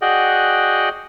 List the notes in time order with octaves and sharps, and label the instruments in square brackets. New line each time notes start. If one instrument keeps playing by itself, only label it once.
[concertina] F#4 G#4 D5 D#5 F#5 G5